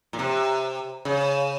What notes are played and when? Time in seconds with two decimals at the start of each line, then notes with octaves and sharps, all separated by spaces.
0.13 A#2
0.19 C3
1.05 C#3